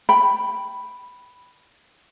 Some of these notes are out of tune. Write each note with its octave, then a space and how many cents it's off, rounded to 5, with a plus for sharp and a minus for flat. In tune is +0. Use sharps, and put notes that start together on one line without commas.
G5 +0 B5 +0